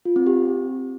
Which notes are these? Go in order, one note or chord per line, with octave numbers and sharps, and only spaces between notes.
F4
C4
G4